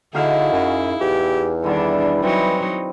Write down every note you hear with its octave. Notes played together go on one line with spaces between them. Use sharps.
D3 D#4 E4 F#4 G#4 F5
F#2
E2 G4
D3 D#3 G3 D4 E4
E3 F#3 C4 D#4 B4